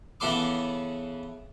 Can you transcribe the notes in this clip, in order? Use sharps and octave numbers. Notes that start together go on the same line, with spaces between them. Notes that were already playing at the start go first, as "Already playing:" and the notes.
C#3 E3 B3 A4 C6 D6